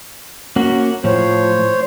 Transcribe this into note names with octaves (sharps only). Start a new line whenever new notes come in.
A#3 C#4 F#4
A2 F3 C5 C#5